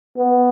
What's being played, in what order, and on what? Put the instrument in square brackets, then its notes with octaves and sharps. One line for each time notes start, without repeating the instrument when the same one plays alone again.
[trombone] B3